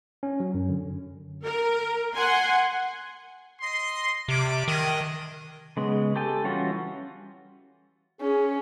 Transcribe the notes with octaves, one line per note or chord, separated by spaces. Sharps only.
C#4
F#3
F#2
D3
A#4
F#5 G#5 C6
D#5 C6
C3 G3 D5 D6
D#3 G#3 D4 D#5
C#3 G#3 B3
G4 A4 G5 G#5
E3 G3 C#4 F4 F#4
C#4 G#4